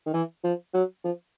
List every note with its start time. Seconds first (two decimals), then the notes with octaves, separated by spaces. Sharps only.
0.06 D#3
0.13 E3
0.44 F3
0.74 F#3
1.04 F3